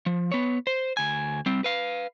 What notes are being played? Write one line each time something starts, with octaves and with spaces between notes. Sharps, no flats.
F3
B3 C#5
C5
D2 G#5
G3 C4
B4 F5